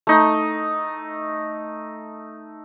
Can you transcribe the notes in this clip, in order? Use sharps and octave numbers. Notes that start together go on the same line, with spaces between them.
A3 D#4